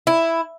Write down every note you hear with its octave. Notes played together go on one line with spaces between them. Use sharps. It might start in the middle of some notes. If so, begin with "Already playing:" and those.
E4